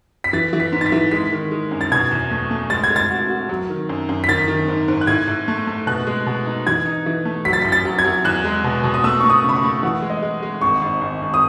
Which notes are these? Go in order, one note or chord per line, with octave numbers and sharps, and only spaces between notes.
B6
E3 A6
E3
B6
G#2
A6
B6
E3
G#3 B6
D#3
G#3
F#2
A6
B2 G#6
E2
A3
A3
G#3 A6
G#6
G#3
A6
F#4
F#4
F#3
D#3
F#2
F#2
B6
D#3 A6
D#3
G#2
G#2
F#6
A2 G#6
A2
A3
A3
B2 F#6
G#3
B2
D#4
E3 G#6
D#4
E3
A3
F#3 B6
A6
B6
A1
A6
F#3
G#6
F#3
E2 F#6
G#3
B2
B2
D#6
A3 E6
A3 C#6
D#6
C#3
B5
C#6
A3
E3 F#5
G#3
D#5
G#3
G#3
G#1 C#6
G#1
G#1
G#1
D#6